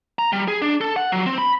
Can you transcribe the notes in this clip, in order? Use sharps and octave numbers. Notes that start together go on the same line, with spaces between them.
A#5
G3
G#4
D4
A4
F#5
F#3
C4
B5